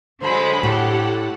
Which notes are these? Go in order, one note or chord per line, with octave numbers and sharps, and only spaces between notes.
D3 F#3 G#3 C5 B5
A2 G4 A4 F#5